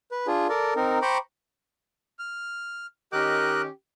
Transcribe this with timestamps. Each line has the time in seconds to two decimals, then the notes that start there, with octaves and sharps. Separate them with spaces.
0.11 B4
0.27 D4 F4 G#4
0.49 A4 A#4 D5
0.76 C4 D#4 A#4
1.02 C5 G5 A#5 B5 C#6 D6
2.19 F6
3.13 D#3 C#4 G4 A#4 D#5 F#6